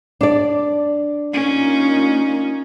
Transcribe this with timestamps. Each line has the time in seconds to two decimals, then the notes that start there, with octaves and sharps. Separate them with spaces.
0.21 D4 D5
1.33 A#3 C#4 D#4 F4